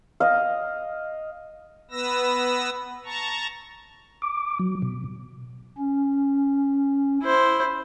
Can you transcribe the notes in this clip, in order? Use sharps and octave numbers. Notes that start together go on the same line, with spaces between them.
D#5 F5
B3 B4 E6 A#6
A5 A#5 C#6
D6
F#3
B2
C#4
E4 C5